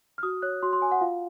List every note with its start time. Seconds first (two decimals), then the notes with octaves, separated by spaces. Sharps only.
0.18 F6
0.23 F#4 D#6
0.42 C#5 F#6
0.63 F#4 C6
0.73 C6
0.81 C#5 G#5
0.92 F#5
1.01 F4 F5